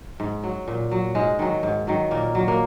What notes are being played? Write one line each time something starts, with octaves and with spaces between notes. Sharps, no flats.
G#2
F#3
A#2
F#3
G#2 G#3
D#3 F#3
G#2
D#3 F#3
A#2 A#3
F#3
A#3